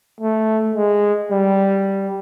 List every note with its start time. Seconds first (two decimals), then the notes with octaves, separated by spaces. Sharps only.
0.21 A3
0.75 G#3
1.31 G3